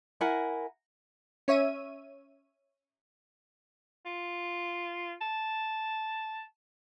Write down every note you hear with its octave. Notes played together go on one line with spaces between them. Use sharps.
E4 A#4 F#5 G#5
C#4 C#5 E5 D#7
F4
A5